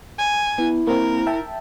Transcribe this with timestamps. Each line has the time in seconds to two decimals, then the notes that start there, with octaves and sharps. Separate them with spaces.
0.18 G#5
0.58 B3 E4
0.87 A#3 C4 A#4
1.27 E5 G5 A5